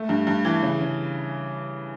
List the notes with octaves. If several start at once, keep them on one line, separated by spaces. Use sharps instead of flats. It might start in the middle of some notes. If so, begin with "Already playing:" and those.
Already playing: A3
G2
G2
E3
C#3
C#3